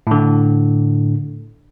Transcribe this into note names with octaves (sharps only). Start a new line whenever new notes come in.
A2 D3